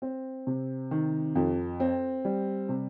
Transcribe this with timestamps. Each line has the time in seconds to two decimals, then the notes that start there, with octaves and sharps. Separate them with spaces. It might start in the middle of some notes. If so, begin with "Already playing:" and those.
0.02 C4
0.47 C3
0.91 D#3
1.35 F2
1.80 C4
2.25 G3
2.69 C3